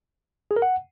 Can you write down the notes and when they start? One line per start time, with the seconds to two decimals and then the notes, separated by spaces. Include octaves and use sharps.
0.51 G#4
0.56 A#4
0.62 F#5